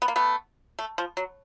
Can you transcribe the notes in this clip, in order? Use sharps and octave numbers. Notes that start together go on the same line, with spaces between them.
B3
A#3
A3 B3
A3
F3
F#3